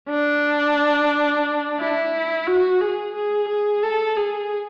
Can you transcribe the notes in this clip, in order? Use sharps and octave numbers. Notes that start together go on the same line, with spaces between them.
D4
E4
F#4
G#4
G#4
G#4
A4
G#4